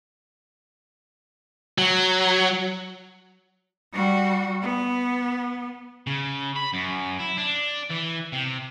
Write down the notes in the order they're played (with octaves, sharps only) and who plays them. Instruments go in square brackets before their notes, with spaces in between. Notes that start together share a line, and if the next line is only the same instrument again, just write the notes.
[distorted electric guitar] F#3
[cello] G3 F#4
B3
[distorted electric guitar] C#3
B5
F#2
E4
D4
E3
C3